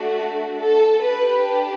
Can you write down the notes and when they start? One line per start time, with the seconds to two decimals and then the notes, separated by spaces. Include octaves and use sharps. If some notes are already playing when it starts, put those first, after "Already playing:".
Already playing: A3 D4 F#4 A4
0.58 A4
1.02 D4 G4 B4